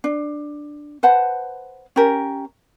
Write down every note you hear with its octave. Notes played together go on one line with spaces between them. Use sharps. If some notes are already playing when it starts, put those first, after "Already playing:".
D4
B4 C5 F#5 A5
C#4 G4 A#4